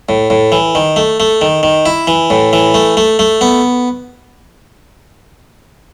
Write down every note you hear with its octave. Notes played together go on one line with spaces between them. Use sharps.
A2
A2
E3
D#3
A3
A3
D#3
D#3
E4
E3
A2
E3
A3
A3
A3
B3